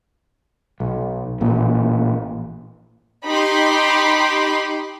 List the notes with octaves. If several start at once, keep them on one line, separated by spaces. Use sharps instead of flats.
B1
A1 A#2
D#4 G4 B5 C6